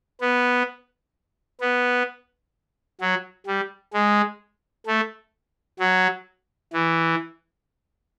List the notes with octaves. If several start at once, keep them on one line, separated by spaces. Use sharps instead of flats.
B3
B3
F#3
G3
G#3
A3
F#3
E3